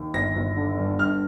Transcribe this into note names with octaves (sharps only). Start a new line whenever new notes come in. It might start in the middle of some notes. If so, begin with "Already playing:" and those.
Already playing: D#2
G1 A#6
G1
D3
G2
G2 F6